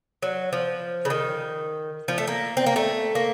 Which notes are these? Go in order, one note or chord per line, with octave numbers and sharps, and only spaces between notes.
F#3
F3
C#3
D#3
F3
A3
A#3
C4
A#3
A3
A#3